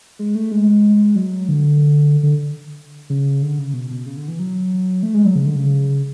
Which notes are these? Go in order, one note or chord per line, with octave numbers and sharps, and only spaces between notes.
G#3
A3
G#3
F#3
D3
D3
C#3
D3
C#3
B2
B2
C#3
D3
E3
F#3
A3
G#3
F#3
C#3
D3
C#3